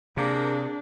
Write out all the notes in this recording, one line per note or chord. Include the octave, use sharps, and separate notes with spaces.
C3 A#3 D4 G#4